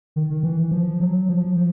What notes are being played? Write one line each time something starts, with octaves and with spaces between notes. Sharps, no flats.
D#3
D#3
E3
F3
F#3
F3
F3